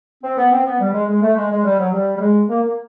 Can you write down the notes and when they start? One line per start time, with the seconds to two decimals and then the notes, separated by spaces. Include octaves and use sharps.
0.23 C4
0.37 B3
0.51 C4
0.66 B3
0.80 G3
0.94 G#3
1.08 G#3
1.22 A3
1.36 G#3
1.51 G#3
1.65 G3
1.79 F#3
1.93 G3
2.16 G3
2.21 G#3
2.49 A#3
2.63 A#3